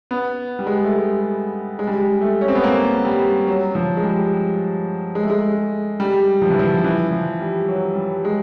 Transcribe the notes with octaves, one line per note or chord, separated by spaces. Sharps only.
B3
G3
G#3
A3
G#3
G#3
G3
G#3
A3
C#4
C4
B3
A#3
G3
F#3
F3
G#3
G3
G#3
A3
G#3
G3
F3
E3
F3
E3
F3
G3
F#3
G3
G#3